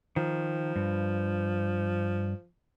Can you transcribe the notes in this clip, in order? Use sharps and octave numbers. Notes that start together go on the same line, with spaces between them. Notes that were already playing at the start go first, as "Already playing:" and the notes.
D#3 F3
G2